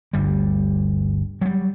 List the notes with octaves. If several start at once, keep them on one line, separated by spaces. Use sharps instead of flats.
G1 D2 G3
F#3 G3